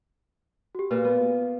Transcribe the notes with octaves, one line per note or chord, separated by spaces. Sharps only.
F#4 G4
A#2 B4
B3